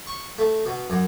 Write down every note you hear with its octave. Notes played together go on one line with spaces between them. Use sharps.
C#6
A3
B2
F#2